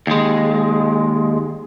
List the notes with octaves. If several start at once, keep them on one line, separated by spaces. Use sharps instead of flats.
D#2 G#3